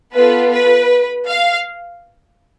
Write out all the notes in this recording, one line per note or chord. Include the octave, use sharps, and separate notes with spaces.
B3 F4 A4 B4
B4
F5